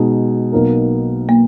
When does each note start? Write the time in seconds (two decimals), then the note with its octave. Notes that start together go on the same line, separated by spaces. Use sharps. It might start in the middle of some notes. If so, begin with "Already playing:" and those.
Already playing: B2 G#3 B3 D#4 G#4
0.52 B1 B2 A#3 D#4 A#4
1.29 A#3